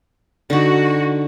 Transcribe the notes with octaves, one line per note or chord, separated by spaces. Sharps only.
D3 D#4 F#4